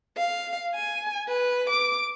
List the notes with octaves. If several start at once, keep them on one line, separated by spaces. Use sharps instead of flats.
F5
G#5
B4
D6